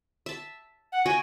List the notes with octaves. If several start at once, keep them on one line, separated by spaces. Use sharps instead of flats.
E5 A5
F#5
F#4 D#5 G5 G#5